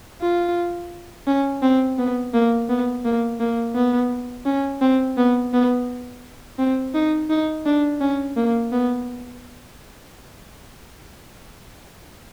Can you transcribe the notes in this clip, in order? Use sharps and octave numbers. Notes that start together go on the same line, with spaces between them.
F4
C#4
C4
B3
A#3
B3
A#3
A#3
B3
C#4
C4
B3
B3
C4
D#4
D#4
D4
C#4
A#3
B3